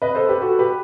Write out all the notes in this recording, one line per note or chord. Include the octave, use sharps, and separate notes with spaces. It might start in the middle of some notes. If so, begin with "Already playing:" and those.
B4 D#5
A4 C5
G4 B4
F#4 A4
G4 B4